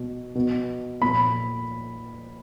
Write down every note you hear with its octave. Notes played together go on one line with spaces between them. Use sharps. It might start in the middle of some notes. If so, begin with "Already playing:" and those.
Already playing: B2
B2
A#2 B5